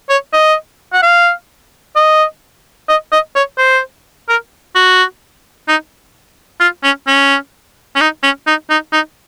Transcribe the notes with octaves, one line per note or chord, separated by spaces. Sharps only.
C#5
D#5
F#5
F5
D#5
D#5
D#5
C#5
C5
A#4
F#4
D#4
F4
C#4
C#4
C#4
D#4
C#4
D#4
D#4
D#4